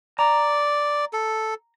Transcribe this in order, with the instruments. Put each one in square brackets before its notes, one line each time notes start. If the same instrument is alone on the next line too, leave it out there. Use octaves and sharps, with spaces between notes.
[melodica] D5 [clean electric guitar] A#5
[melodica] A4